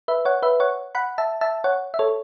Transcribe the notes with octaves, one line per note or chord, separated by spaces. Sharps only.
B4 E5
C#5 F#5
B4 E5
C#5 F#5
F#5 B5
E5 A5
E5 A5
C#5 F#5
E5
A4 C#5